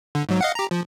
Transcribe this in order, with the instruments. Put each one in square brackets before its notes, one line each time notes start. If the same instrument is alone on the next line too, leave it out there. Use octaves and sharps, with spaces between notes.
[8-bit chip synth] D3
G#2 F#3
D#5 F5 F#5
G4 A#5
F3